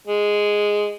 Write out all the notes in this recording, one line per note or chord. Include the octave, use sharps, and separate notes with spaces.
G#3